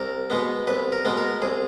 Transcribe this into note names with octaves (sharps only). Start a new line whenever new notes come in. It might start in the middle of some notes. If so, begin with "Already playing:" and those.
Already playing: C2 A#4
B2 G#3 B3
C2 B4
A#4
B2 G#3 B3
A#4
C2 G#4